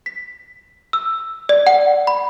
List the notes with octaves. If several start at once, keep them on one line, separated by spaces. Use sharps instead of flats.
B6
E6
D5
F#5
B5